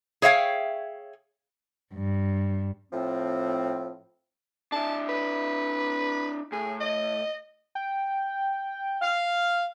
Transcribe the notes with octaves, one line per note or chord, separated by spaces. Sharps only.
G#4 C#5 E5 F5 G5
G2
A2 F3 C4
D4 E4 A5
B4
A2 G#4
D#5
G5
F5